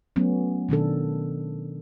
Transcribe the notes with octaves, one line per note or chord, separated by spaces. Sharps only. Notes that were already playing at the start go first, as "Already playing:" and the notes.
F#3 A3 B3 C#4
B2 D#3 D4 A4